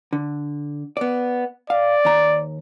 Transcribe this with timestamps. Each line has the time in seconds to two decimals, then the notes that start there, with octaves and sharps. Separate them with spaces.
0.13 D3
0.97 B3 D5
1.70 D5 F5
2.05 D#2 A#5